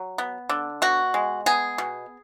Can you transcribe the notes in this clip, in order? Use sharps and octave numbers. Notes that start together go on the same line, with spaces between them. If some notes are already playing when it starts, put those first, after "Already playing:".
Already playing: F#3
B3
D3
B2 F#4
G#3
B3 G#4
B2